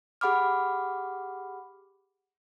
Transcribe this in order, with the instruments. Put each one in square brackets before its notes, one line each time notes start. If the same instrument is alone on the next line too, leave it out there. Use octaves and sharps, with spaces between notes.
[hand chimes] G4 G#4 F#5 B5 D6 F6